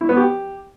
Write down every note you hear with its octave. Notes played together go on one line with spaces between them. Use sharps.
E4
B3
G4